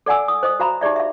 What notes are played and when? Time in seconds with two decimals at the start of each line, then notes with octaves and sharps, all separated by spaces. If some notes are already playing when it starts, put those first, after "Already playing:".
0.06 A4 D5 F#5 G#5 E6
0.28 D#6
0.43 C5 D#5 D#6
0.60 F#4 C5 F5 A#5 B5
0.81 D#4 G4 G#4 D5 E5
0.96 E5 F5